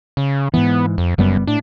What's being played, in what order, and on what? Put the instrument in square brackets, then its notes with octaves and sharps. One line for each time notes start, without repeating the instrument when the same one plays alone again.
[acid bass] C#3
[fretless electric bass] G#2 E3 [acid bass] B3
[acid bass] F2
[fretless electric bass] F#1 G3 B3 [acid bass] F#2
[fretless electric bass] A2 [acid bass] D4